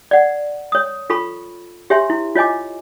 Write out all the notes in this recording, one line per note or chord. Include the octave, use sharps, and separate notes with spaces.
D5 F#5
C#5 D#6
F4 A4 B5 C#6
G4 C#5 E5 G#5 C6
E4
F4 C#5 D#5 G#5 D6